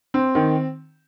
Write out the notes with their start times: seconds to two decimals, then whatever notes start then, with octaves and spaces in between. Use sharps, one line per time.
0.14 C4
0.35 D#3